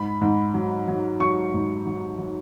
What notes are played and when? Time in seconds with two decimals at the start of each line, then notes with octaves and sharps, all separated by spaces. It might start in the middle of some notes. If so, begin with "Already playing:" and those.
Already playing: G#2 B5
0.21 G#2
0.54 F#3
0.88 F#3
1.20 F#3 C#6
1.54 G#2
1.87 F#3
2.19 F#3